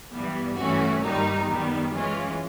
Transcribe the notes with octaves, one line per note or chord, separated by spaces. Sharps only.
G2 E3 G3 B3
G2 E3 A3 C#4 F#4
G2 D#3 G3 A#3 D#4
F#2 D#3 G3 B3
E3 G#3 C#4 F4